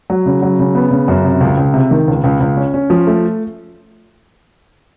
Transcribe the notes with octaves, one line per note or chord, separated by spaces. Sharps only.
F#3
C#3
F#3
C#3
B3
C#3
F#2
C3
C#2
C#2
C3
D#3
C#2
C#2
C#2
C#4
C#4
F3
A3